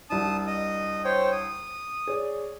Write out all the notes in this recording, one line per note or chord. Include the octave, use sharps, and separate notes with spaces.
C2 D4 A5 D#6
D#5 D#6
C5 C#5 G5
D#6
G#4 C#5 D5